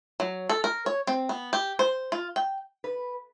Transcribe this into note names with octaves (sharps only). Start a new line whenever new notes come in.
F#3
A4
A#4
C#5
C4
B3
G4
C5
F4
G5
B4